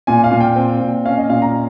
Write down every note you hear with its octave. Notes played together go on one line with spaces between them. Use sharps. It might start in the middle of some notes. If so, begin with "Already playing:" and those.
A#2 G#5
F5
A#2
G5
C4
A#2
C#4 F5
D#5
A#2 F5
A#5